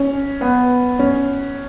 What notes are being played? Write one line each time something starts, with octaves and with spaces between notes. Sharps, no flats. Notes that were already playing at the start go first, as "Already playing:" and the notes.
Already playing: C#4
B3
C#4